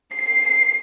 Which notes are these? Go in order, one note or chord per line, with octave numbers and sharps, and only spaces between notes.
C7